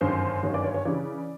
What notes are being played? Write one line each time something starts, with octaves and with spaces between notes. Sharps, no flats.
G1 F#2 D#3 C5
G1 F#2 D#3 C#5
D5
C#5
C#5
C#3 E3 D5